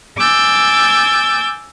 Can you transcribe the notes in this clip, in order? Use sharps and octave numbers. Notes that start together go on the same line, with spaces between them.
G#5 D6 E6 G6 A6